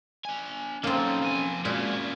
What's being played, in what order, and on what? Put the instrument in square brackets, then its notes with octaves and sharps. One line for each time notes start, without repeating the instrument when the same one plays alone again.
[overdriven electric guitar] D4 G#5
[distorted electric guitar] F#3 D#4 [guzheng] A#3 C4 [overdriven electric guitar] C#4 A4
[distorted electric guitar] F3 G#5
[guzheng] A#2 [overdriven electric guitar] G#3 F#4 [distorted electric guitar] C#4 E4